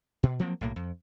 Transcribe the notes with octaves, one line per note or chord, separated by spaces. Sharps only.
B2
F3 F#3 A#3 C4
B1 A2 A#3
F2